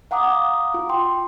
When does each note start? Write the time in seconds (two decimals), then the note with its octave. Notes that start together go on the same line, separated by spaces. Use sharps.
0.11 F5 F#5 A#5 D6 D#6
0.74 F4
0.89 G5 C6